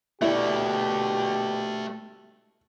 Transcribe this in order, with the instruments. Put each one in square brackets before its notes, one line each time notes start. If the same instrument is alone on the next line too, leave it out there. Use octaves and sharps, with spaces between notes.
[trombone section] A#1 B2 G4 [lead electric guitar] A3 D5 [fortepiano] E4